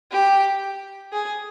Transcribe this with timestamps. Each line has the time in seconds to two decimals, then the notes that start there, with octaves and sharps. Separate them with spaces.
0.11 G4
1.13 G#4